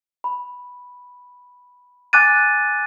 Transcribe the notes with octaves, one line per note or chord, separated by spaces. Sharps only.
B5
G#5 D6 F#6 A6 D#7